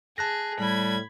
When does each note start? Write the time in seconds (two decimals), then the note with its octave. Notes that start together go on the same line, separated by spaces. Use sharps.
0.18 G#4 A5 F#6 A#6
0.60 A2 G3 B5 G#6